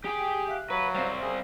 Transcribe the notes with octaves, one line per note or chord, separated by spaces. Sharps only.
G4 G#4 G5
E5 F5 F#6
F#3 B4
G3 C4 C5 F5
C#4 G#4 C6